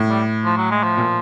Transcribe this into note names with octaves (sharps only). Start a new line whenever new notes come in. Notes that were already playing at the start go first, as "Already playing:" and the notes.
Already playing: A2
G3
F3
F#3
G#3
F3
A#2